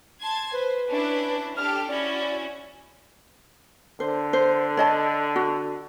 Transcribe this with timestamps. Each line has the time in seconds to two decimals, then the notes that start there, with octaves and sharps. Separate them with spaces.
0.22 A5 C6 G#6
0.52 B4 C5
0.87 C#4 D4 E4
1.57 D4 G4 A4 F6
1.88 C#4 E4 F#4 D5
4.00 D3 C5
4.33 C5
4.77 C#5 D#5 A5
5.36 F#4